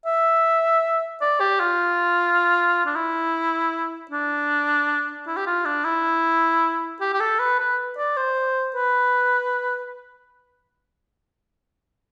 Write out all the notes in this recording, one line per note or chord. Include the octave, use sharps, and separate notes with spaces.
E5
D5
G4
F4
D4
E4
D4
E4
G4
F4
D4
E4
G4
G4
A4
B4
B4
D5
C5
B4